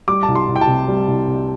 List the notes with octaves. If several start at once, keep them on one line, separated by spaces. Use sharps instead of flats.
G3 D6
A5
C2
C6
C2
G5
A5
C3
G3
C2
C2